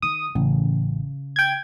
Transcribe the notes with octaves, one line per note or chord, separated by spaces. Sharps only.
D#3 D#6
A1 C#3
G5 G#6